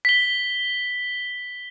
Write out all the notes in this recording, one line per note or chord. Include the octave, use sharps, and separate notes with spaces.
B6 G7